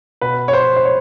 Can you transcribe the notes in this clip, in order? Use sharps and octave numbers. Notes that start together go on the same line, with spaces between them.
B2 B4
C#5
C5
C5
C#5